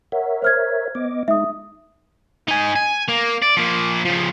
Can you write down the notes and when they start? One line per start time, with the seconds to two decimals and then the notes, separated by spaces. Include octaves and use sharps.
0.12 A#4 C#5 E5 F#5
0.42 C5 F6 G#6
0.95 B3 D#5 D6
1.28 G#3 D#4 E5 D#6
2.48 D#4 G#5
2.75 G#5
3.08 A#3
3.42 D5
3.57 F3 A#3
4.05 C#3 F3